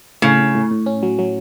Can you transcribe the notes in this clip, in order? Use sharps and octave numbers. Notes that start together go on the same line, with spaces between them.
A2 C#3
A2
A2
A2
C#4
F#3
F#3